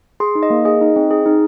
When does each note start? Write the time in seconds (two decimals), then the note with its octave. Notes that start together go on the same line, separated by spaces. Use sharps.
0.20 G#4 C6
0.35 D#4
0.43 D#5
0.50 A#3
0.65 G#4 D#5
0.81 D#4
0.96 C4
1.11 G#4
1.26 D#4